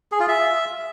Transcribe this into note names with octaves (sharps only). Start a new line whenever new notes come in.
G#4
F4
E5